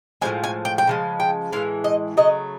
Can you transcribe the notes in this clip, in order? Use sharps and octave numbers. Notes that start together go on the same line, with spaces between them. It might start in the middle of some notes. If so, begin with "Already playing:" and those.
A2 F3 G#3 G#5
G#5
G5
G5
C#3 F3 G#3
G5
A2 E3 G#3 F5
D#5
C#3 F#3 A3 D#5